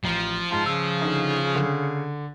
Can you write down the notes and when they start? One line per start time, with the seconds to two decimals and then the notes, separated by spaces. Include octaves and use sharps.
0.04 A1 F3
0.51 G#2 F4 A5
0.66 C#3 E6
1.01 D3 D#4
1.55 D3